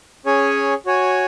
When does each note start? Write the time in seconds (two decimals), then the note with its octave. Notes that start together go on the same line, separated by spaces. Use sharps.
0.26 C#4 G#4 C#5 G#5
0.86 F#4 C#5 G#5